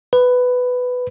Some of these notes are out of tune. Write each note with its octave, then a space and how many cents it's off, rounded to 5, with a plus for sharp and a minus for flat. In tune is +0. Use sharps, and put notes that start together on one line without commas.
B4 +10